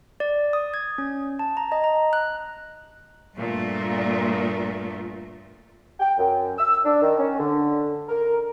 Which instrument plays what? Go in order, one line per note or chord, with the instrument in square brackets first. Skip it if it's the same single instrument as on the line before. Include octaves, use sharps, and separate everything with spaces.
[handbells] D5
D#6
G#6
C#4
A5
A#5
D#5
A#5
F#6
[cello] G2 A3 [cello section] A#2
[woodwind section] G5
F#2
E6
D4
D#3
C#4
D3
A#4